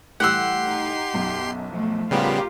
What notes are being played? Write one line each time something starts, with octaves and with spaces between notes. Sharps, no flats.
A2 E3 G3 G4 F#5 C6 E6 C7
D#4
B1 F#2
F3 A3
A1 C#3 G3 B3 F4 G4 A#4